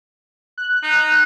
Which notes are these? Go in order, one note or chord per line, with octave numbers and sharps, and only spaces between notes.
F#6
D#4